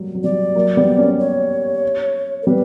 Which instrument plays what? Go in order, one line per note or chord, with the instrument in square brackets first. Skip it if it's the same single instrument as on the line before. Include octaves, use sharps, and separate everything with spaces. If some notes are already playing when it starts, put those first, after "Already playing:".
Already playing: [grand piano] F#3 G3 A#3
F#3
[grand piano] G3 [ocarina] D5
[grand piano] F#3 A#3
G3 B3
A#3 C#4
[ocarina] C#5
A#4
[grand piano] G3 B3 [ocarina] B4